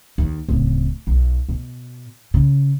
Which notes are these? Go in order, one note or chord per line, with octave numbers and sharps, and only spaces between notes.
D#2
D1 C#3
B1
B2
C#3